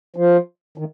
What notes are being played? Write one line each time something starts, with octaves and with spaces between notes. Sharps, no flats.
F3
D#3